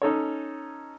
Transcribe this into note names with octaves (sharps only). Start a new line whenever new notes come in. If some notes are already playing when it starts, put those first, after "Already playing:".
C#4 D#4 A4 C#5